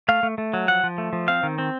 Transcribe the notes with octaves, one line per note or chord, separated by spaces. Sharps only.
A3 F5
A3
A3
F#3
F3 F#5
F3
A3
F3
C4 F5
D#3
C4